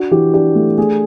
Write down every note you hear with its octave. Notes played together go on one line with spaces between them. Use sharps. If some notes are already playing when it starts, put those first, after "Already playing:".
Already playing: D4 F#4
E3 G4
D4 G4
A3
A3 G#4